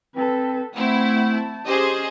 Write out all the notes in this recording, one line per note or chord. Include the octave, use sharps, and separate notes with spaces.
C4 A4 B4
A3 C4 E4 F#5
A5
C#4 G4 G#4 C5 D#5